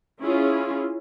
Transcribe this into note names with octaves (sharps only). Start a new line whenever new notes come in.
C#4 E4 F4 G#4